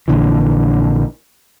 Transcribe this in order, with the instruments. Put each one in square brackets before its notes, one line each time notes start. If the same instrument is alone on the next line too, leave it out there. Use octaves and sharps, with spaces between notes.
[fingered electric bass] A#1 A#2 D3 E3